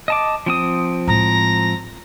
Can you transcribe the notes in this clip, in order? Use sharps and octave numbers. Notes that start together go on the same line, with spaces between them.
D#5 A5 D6
F3 C4 D#6
A2 G#3 A#5